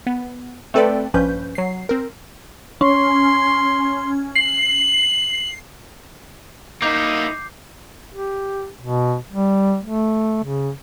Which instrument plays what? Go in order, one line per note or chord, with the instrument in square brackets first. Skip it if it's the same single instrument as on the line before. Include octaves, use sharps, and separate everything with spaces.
[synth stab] B3
A3 C4 A4 B4 D5 G5
A#1 G2 F3 C#4 B4 G6
F#3 C7
C4 A#4
[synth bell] C#4 [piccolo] C6
[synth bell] C7 [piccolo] F#7
[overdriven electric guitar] A#3 E4 [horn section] D#4 [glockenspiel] D6 G6 C7
[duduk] G4
B2
G3
A3
C#3